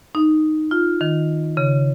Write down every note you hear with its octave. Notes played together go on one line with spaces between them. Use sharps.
D#4
F4
D#3
C#3